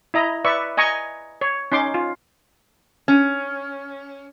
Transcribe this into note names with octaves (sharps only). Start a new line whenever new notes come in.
E4 D#5 A#5
B4 D5 E5 C#6
D#5 G#5 A#5 C#6
C#5
C#4 D#4 C6 D6
F4
C#4